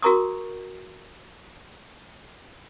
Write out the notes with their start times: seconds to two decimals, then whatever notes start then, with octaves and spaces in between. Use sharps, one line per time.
0.02 F#4 G#4 A#4 A#5 C#6 D#6